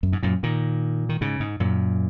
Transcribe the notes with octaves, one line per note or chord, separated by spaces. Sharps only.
F#2
G#2
F#2 A#2
A#2 D#3
D#3
G#2 C#3
G#2
F#2 A#2